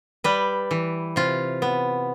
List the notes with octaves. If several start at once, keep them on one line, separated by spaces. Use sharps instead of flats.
G3 B4
E3
C3 F4
B3